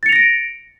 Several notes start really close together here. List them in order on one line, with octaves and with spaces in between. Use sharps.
A6 C#7 F7 A#6 D7